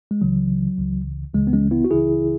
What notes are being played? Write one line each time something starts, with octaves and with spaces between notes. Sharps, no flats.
G#3
C#2 C#3 E3 F#3
C#2 C#3 E3
C#2 C#3 E3 G#3
B3
G#3 C#4
B3 E4
F#4
C#2 C#3 E3 E4 G#4